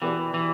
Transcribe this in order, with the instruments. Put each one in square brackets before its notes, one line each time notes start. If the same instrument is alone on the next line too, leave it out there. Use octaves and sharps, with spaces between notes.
[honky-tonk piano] B2 B3 G4 B4 D5 [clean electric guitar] E3
[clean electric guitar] E3